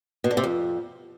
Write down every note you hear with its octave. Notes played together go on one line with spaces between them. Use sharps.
B2
D3
C3
F2